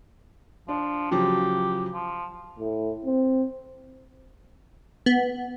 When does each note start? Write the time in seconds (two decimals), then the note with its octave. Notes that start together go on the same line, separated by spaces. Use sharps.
0.68 F3 D4
1.11 C#3 F3 F#3 G4
1.93 F3
2.59 A2
3.05 C4
5.06 B3